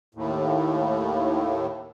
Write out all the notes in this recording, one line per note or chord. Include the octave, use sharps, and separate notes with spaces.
D#2 A2